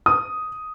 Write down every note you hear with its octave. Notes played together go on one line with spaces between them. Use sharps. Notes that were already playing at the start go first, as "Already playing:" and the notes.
D#6